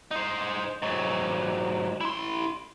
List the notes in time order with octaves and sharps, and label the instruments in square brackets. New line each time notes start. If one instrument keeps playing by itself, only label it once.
[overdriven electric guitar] D#4 C5
G#2 F#3
E4 C6